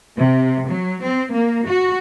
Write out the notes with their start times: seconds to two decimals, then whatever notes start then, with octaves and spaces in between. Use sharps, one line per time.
0.19 C3
0.70 F#3
1.05 C4
1.33 A#3
1.67 F#4